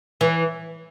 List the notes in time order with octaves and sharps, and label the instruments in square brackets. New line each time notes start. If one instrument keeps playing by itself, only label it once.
[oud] E3